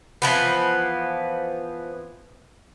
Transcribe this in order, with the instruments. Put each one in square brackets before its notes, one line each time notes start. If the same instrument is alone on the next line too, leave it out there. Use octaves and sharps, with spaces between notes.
[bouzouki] E3 F3 B3